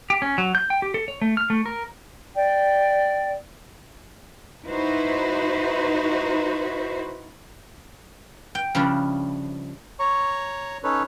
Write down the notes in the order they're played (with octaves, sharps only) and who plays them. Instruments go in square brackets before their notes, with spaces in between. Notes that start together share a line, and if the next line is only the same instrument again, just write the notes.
[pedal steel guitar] G4
C#4
F#3
G6
G5
G4
A4
C#5
A3
F6
A3
A#4
[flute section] D5 G5
[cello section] D#4 E4 F#4 B4 C5
[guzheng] G5
C#3 F3 G3 D4 E4
[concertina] C#5 A#5 C#6
C#4 D#4 A4 B4 C#5